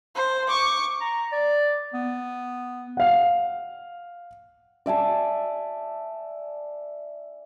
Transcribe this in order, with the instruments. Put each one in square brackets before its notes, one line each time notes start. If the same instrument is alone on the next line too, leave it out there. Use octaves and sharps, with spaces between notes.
[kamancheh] C5
C#6 D6
[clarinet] A#5
D5
B3
[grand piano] F5 F#5
[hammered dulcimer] D5 E5 G#5 A5